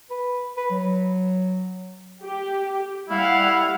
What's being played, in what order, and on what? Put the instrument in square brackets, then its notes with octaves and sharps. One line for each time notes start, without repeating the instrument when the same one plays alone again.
[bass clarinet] B4
B4
F#3
[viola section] G4
[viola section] G3 F5 F#5 [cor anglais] E4